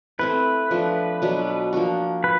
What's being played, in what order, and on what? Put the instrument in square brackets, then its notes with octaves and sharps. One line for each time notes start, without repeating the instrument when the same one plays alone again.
[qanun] A3 C4 E4 [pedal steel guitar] B4
[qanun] F3 A3 D4
B2 F#3 B3 D4
F3 A#3 D4 F#4
[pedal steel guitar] B4